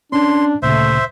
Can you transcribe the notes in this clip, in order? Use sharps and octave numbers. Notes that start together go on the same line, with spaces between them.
C#4 D4 C6
D2 A#2 C#3 A3 C5 E5